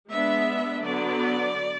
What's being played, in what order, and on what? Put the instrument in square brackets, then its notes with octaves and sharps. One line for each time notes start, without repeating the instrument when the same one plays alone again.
[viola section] G#3 B3 D4 E5
D3 F#3 B3 D5